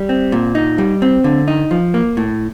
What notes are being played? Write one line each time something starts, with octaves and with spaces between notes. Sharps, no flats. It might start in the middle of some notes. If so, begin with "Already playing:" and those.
Already playing: G3
C4
A#2
D#4
G3
C4
D3
D#4
F3
A#3
A2